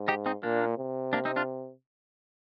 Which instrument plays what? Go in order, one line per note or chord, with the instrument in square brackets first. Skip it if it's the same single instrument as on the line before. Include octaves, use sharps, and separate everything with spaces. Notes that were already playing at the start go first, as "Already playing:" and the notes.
Already playing: [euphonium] G#2
[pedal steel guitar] D#4 G4
C4 D#4
[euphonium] A#2 [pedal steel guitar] A#3 D4
[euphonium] C3
[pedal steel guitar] A#3 D4
C4 D#4
D4 F4